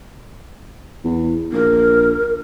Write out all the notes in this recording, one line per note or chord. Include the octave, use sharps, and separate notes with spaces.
E2
A#1 A#4